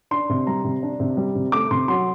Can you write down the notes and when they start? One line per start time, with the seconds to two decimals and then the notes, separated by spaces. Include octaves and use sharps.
0.11 D4 C6
0.30 C3
0.47 G3 A#5
0.64 C3
0.83 D4
1.00 C3
1.17 G3
1.35 C3
1.52 A3 D6
1.71 C3 C6
1.88 F#3 C6